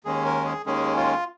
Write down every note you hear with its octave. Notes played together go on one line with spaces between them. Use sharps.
D#2 D#3 G#3 C#4 G#4
A#4
G#4
D#2 D#3 G#3 C#4 G#4
F4